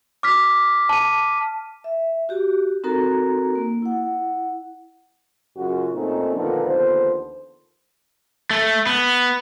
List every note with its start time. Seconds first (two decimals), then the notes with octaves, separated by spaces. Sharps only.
0.23 D6 F6 B6
0.89 A5 D#7
1.84 E5
2.29 F#4 G4
2.84 C4 D#4 F#4 A4 A#4 A#5
3.55 A#3
3.82 E4 F#5
5.57 F#2 C#3 F4 F#4
5.93 A#2 A3 C4 C#4 D#4
6.34 A#2 D3 D#3 F3 B3
6.65 D#2 D3 F3 B3 C5
8.51 A3
8.87 B3